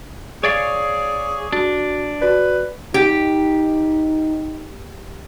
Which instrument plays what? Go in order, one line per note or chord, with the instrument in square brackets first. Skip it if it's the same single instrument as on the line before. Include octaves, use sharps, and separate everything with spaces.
[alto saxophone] G#4 [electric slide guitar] C#5 D5 F5
[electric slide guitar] D4 [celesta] F#4
[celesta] F#4 D5 [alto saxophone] B4
[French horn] D#4 [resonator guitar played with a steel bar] G4